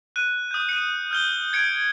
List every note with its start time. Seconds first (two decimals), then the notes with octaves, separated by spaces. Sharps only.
0.16 F#6 D#7
0.51 D#6 G6
0.69 C#7 D#7
1.11 F6 G6 G7
1.53 G#6 C#7 D7